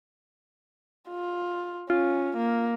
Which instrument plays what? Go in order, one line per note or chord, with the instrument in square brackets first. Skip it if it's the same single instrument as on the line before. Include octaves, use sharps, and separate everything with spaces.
[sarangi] F4
[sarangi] C#4 [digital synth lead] F4
[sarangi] A#3